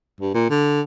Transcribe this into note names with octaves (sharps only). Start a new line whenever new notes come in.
G2
A#2
D3